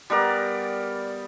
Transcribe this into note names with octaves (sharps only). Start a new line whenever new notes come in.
G3 B3 A#4 D5